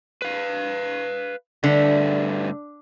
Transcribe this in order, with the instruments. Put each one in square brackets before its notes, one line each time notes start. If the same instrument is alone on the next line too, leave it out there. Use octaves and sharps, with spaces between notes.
[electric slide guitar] B4 F5
[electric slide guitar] G2 A3 E5 [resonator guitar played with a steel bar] D3